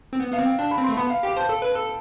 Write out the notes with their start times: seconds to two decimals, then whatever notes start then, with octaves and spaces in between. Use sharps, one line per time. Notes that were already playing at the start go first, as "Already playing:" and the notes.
0.13 C4
0.20 B3
0.31 B3 F5
0.39 C4
0.45 G5
0.59 D4 A5
0.71 B5
0.78 C4
0.84 C6
0.89 A3
0.97 B3 B5
1.10 F5
1.23 G4 G5
1.36 C5 A5
1.49 A4
1.62 B4
1.75 A4